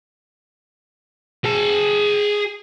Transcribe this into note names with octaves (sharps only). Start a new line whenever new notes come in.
G#4 A5